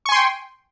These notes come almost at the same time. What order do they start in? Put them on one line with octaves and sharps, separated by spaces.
C#6 G#5 C6 G5